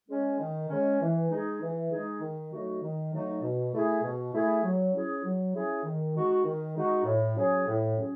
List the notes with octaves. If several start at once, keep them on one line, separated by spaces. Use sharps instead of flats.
G#3 C#4
D#3
G#3 C#4
E3
G#3 D#4 G#4
E3
G#3 D#4 G#4
D#3
F#3 A3 D#4 F#4
D#3
F#3 A3 D#4 F#4
B2
A3 E4 G#4
B2
A3 E4 G#4
F#3
C#4 E4 G#4
F#3
C#4 E4 G#4
D#3
G#3 D#4 F#4
D#3
G#3 D#4 F#4
A2
F#3 C#4 G#4
A2
F#3 C#4 G#4